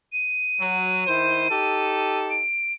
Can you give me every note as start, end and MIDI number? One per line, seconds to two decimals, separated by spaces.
0.13 2.18 99
0.60 1.06 54
1.07 1.46 51
1.07 1.46 64
1.07 1.46 72
1.51 2.44 63
1.51 2.44 67
1.51 2.44 69
2.30 2.73 98